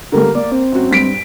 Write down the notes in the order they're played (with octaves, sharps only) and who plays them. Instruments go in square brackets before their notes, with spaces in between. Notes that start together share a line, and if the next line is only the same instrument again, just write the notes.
[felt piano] D3 G3 A#3 [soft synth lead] A#4
[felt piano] A#3 [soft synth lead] D5
[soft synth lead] C4
[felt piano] F#2 F#4
G2 B6 D7